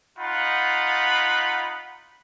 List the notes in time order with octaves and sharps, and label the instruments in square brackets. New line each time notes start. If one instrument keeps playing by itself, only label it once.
[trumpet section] D#4 F4 F#5 B5